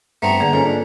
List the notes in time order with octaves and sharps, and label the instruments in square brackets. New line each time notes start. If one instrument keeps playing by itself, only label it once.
[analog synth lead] G2 [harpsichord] A3 B3 C4 [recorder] A#5
[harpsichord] D3 [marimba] A#3 G#4 B4
[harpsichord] G#2 [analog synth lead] C#4 [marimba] F4 A4 A#4
[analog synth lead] D4